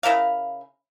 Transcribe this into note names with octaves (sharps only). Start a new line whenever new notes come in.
C#3 E4 A#4 F5